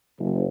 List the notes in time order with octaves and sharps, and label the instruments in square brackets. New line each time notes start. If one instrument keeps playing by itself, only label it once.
[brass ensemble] F#1